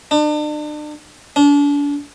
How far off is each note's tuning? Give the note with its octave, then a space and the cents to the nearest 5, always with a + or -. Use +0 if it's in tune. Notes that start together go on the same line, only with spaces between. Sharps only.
D4 +40
D4 -35